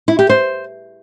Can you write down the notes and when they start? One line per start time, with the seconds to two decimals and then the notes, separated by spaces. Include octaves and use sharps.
0.08 E4
0.19 G4
0.29 C5